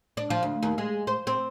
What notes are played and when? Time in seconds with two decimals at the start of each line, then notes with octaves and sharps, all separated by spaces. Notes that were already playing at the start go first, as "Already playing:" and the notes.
0.17 D4
0.30 F3
0.43 D2
0.63 D#2
0.78 G#3
1.07 C5
1.27 C4